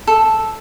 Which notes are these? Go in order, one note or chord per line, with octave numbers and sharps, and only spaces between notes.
A4